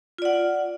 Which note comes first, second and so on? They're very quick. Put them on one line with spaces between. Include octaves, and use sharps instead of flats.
F4 D5 F#5